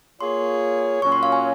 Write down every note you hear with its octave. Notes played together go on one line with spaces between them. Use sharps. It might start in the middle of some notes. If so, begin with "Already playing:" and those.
A#3 F4 G#4 C#5 C6
A#2 F#3 C#4 C#6
C6
F5
G#5